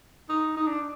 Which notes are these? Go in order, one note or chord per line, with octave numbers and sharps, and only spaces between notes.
D#4
D#4
D4